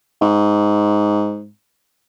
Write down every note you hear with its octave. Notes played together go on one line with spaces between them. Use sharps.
G#2